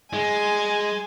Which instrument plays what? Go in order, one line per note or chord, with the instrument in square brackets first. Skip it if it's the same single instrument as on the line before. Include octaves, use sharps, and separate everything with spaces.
[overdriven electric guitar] G#3 [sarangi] G#5